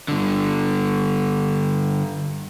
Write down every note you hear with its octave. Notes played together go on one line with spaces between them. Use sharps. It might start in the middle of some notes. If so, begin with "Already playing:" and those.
G2 D3